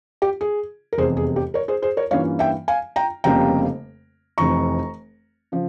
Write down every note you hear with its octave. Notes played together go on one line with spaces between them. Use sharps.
G4
G#4
A#4
F1 E2 C3 G#4 C5
G#4
G4
A#4 C#5
G#4 C5
G#4 C5
A#4 C#5
G2 E3 A#3 C#4 F4 C#5 F5
E5 G5
F5 G#5
G5 A#5
F1 F2 C#3 G3 A#3 G5 A#5
F1 F2 E3 A#5 C#6
C#3 F3